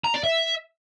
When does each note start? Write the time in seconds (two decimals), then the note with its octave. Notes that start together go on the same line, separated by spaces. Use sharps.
0.04 A#5
0.14 D5
0.24 E5